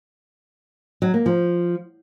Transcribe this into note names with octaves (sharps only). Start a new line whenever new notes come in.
F#3
A#3
F3